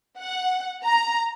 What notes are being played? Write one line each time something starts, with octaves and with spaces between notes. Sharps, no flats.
F#5
A#5